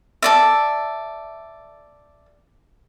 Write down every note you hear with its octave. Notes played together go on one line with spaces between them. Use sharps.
A4 D5 E5